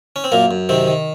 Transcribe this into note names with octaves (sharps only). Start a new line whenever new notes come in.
C#4
C4
F#2 A#2 A#3
F#2
C3 D#3 C4
D#3